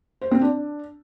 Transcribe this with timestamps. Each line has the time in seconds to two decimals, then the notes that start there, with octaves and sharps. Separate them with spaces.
0.21 C5
0.31 C4
0.41 D4